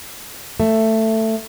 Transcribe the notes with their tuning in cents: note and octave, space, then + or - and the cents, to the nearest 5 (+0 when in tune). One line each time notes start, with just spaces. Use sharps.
A3 +10